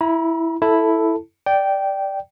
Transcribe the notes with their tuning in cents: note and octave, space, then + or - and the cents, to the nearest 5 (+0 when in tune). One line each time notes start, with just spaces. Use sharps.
E4 +0 A#5 +45
E4 +0 A4 +0 A5 +0
D5 +0 G5 -10